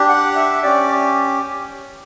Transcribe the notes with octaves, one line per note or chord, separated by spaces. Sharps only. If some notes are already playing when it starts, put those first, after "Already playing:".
Already playing: D4 G4
F#5
E5
C#4 G4 D5